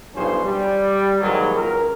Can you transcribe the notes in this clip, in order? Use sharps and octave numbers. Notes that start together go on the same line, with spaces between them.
B1 G2 F3 C#4 C5
G3
D#2 G#2 D#3 E3 F#3
C#2 A#4